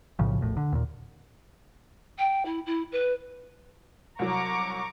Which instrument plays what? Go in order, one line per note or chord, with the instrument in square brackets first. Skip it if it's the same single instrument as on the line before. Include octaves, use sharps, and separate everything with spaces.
[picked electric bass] B1 A2 C#3 F3
E1 A#1 A2
D3
D#2 A#2
[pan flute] G5
E4
E4
B4
[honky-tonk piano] C2 F#3 [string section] A#5 C#6 D6